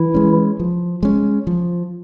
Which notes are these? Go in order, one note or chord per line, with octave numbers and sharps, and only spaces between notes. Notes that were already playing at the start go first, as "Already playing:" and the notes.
Already playing: E3 E4
G#3 C#4
F3
G#3 C#4
F3